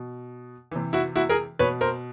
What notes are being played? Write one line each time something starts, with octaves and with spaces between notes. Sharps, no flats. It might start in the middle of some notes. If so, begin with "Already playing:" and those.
Already playing: B2
C3 E3
E4 F#4
E4 F#4
G#4 A#4
B2 B4 C#5
A#4 C5